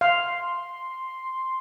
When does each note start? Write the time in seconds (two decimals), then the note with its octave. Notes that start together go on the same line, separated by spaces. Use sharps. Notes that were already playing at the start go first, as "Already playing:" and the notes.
0.01 F5 C6